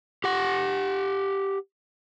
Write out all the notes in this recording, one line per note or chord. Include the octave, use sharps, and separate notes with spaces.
G4 F#5